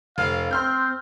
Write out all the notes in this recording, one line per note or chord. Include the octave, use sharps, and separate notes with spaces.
F1 F5
C4 C6 F6 G6